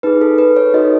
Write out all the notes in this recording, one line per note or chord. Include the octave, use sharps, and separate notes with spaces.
D#4 G#4 B4
A4
B4
C#5
D#4 F#4 A4 D#5